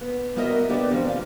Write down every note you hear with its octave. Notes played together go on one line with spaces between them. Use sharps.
B3
G3 B3 F#4 A#4 D#5 E5
D#3 B3 D4 G4 A4 D5
D#3 F3 G3 C4
E3 F4